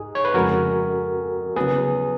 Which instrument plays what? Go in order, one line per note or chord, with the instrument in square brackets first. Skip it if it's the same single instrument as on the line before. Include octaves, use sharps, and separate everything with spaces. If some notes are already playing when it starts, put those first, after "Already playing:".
Already playing: [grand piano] G#2 [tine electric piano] G#4
[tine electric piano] C#5
B4
[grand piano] F2 C#3 G#3 [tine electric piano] F#4 A#4
[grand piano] C#3 F#3 B3 [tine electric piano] G#4 B4